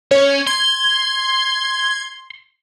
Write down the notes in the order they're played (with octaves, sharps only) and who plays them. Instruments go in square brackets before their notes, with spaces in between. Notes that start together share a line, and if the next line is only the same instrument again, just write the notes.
[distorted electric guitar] C#4 [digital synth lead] C#5
[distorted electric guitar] C6 [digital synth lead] G#6